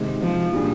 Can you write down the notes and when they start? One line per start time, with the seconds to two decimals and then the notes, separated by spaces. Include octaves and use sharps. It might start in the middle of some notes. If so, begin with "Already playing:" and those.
Already playing: C3 D#3 G#3
0.21 F3
0.52 A#2 G3 D4 G#4